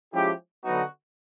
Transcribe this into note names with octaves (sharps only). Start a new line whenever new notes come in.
F3 G#3 C#4 E4 G4
D3 F#3 B3 D#4 F#4